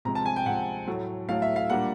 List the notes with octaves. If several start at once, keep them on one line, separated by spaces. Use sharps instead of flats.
C3 F3 G#3 C4 A#5
A5
G#5
G5
C3 F3 G#3 C4 F#5
A2 F#3 A3
A2 F#3 A3 F5
E5
F5
A#2 G3 A#3 D4 F#5